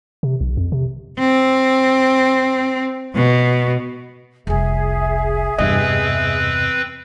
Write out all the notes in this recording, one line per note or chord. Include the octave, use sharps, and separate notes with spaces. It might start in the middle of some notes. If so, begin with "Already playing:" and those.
C3
B1
F2
C3
C4
B2
F1 C2 G#4 E5
E2 G2 C3 C4 B4 D#5